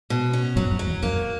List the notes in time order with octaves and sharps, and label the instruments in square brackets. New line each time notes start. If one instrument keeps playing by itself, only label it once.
[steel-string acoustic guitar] B2
C#4
[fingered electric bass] F#2 A#2 [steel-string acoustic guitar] F#3
[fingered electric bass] F#2
[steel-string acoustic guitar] F#3
[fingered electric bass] E2
[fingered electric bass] F#2 [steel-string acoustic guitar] A#3